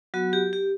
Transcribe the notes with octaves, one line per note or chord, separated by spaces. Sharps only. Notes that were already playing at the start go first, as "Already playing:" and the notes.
F#3 B3 F#4
G4
G4